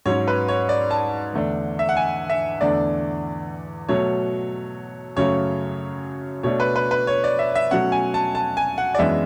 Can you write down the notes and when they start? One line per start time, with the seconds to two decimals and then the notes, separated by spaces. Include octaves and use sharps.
0.06 G#2 F#3 C#4 C#5
0.28 B4
0.48 C#5
0.69 D5
0.91 A5
1.33 E2 D3 A3 D4
1.79 E5
1.89 F#5
1.97 G#5
2.30 E5
2.61 E2 D3 A3 D4 D5
3.89 B2 F#3 A3 C#5
5.16 F#2 C#3 F#3 A3 C#5
6.43 B2 A3 D4 C#5
6.60 B4
6.76 B4
6.91 B4
7.07 C#5
7.24 D5
7.39 E5
7.55 E5
7.71 B2 F#3 A3 C#4 F#5
7.92 G#5
8.14 A5
8.35 A5
8.57 G#5
8.78 F#5
8.95 D5
8.99 F#2 E3 G#3 B3 D4 E5